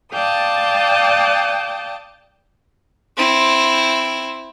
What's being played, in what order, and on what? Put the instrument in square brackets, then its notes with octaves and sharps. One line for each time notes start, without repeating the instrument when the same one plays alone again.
[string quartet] D5 F5 G5 A5 D#6
[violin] C4 E4